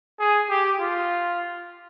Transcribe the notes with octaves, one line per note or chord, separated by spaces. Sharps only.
G#4
G4
F4